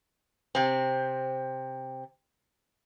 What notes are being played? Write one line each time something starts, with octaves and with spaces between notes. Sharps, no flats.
C3 C4